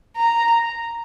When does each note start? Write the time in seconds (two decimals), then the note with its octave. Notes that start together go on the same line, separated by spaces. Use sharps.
0.16 A#5